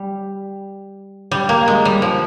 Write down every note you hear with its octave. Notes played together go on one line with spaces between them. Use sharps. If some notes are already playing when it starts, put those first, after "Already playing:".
Already playing: G3
G3
A#3
G#3
G3
F3